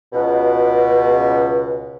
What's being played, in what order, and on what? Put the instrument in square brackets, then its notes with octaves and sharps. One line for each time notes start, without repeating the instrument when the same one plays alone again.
[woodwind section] C#2 B2